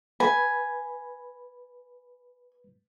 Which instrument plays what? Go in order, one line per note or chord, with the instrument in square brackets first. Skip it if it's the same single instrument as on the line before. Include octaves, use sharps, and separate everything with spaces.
[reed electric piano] B4 B5 [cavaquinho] G#5